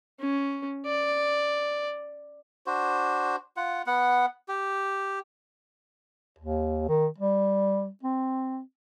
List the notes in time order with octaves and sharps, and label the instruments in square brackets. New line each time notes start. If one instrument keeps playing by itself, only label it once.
[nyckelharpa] C#4
D5
[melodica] D4 F#4 C5
F4 F#5
B3 F#5
G4
[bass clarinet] D#2
D#3
G3
C4